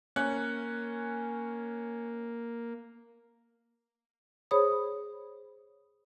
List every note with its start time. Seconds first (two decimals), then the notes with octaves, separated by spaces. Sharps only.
0.16 A#3 C#4 F#6
4.51 G#4 C5 C#5 B5 D#6